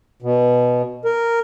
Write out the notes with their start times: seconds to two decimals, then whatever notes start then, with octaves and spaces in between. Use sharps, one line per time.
0.22 B2
1.05 A#4